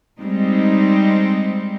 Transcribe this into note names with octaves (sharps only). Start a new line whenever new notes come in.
G3 G#3 C4 D#4